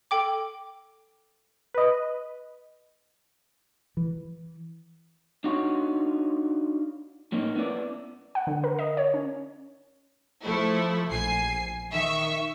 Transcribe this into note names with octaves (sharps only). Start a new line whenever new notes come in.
A4 G5 D6
B4 D#5
E3
D4 D#4 F4 F#4 C#5
A2 A#3 C#4 D#4
B3 C#4 D4 E4 D5
F#5
D3
A#4
D#5
C#5
C#4
F3 A3 E4
A#1 G#5 C7
D#3 E5 C#6